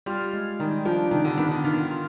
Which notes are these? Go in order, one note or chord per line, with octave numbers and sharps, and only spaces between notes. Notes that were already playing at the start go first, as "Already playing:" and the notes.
G3 F4
G#3
D#3 G3
F3 D4
C3 D#3
D3
D#3 B3
D3
D#3 F4
F4